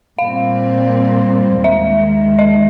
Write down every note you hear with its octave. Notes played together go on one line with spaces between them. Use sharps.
A#2 G3 C4 F5
D#2 D#3 G#3 E5
D#5